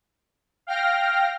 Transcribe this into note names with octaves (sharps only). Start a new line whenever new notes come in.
F5 G5 F6 A#6